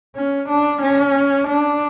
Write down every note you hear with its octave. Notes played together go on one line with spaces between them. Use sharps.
C#4
D4
C#4
D4